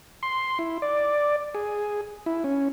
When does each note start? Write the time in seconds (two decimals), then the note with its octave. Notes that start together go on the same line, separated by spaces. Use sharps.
0.23 C6
0.59 E4
0.82 D5
1.55 G#4
2.26 E4
2.44 C#4